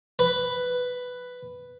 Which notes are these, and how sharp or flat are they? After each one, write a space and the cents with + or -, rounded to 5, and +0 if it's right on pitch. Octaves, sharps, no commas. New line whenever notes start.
B4 +5